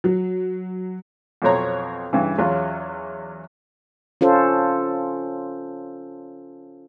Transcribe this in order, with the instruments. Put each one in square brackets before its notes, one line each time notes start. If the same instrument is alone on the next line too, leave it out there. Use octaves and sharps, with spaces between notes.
[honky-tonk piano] F#3
[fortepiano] F2 B2 F#3 C4 C#5 A#5
G2 C#3 E3
E2 F#3 C#4 F4
[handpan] C#4 F4 A4 C5